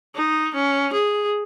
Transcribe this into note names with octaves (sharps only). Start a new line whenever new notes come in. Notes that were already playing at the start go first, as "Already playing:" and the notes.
D#4
C#4
G#4